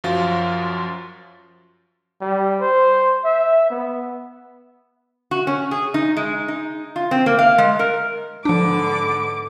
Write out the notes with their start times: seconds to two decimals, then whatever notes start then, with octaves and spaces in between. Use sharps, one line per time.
0.04 F#2 F3 F4 F#4
2.21 G3
2.61 C5
3.25 E5
3.70 B3
5.31 F#4
5.47 C#4
5.71 G#4
5.94 D#4
6.17 G#3
6.48 D#4
6.96 F4
7.11 C4
7.26 A#3
7.39 F5
7.58 G#3
7.79 A#4
8.45 G#2 D3 F3 B3 D4 D6